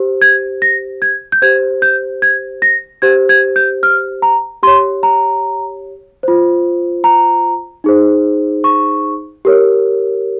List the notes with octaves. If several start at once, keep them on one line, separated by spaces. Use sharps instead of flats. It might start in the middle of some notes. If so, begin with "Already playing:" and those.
Already playing: G4 C5
G#6
A#6
G#6
G6
G4 C5 G#6
G6
G#6
A#6
G4 C5 G#6
G#6
G6
F6
A#5
G4 C#5 C6
A#5
F4 C5
A#5
D#4 G#4 C5
C#6
G4 A#4 C#5